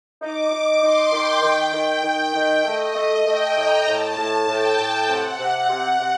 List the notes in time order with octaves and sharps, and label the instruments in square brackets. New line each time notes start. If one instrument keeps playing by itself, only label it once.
[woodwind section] D#4 [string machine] D6
[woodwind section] D#4
[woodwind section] D#4 [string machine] C6
[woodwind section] D#3 [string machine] G5
[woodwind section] D#3
D#3
D#3
D#3
[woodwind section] A3 [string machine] D#5
[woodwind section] A3
[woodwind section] A3 [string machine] G5
[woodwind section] A2 [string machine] A#5
[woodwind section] A2 [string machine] A5
[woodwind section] A2
[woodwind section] A2 [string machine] G5
[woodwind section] A2
[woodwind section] C3 [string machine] F#5
[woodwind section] C3
C3
C3